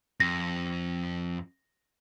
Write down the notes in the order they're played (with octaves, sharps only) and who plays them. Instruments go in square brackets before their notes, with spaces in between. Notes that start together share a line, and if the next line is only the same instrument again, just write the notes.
[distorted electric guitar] F2 [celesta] A#6